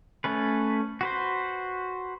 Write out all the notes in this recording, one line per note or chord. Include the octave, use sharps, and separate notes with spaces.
A3 C#4 B4
F#4 B4 C5